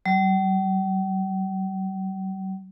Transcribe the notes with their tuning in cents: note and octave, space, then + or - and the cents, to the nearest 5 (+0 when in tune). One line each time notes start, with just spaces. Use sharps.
G3 -45